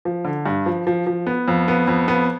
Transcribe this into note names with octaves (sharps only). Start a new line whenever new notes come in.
F3
D3
G2
F3
F3
F3
B3
F2
B3
F2
B3